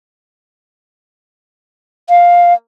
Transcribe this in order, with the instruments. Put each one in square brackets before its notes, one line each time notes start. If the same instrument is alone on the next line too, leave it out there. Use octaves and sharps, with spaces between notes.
[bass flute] F5